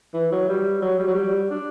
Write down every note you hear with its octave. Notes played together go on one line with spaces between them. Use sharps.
E3
F#3
G3
F#3
G3
F#3
G3
D4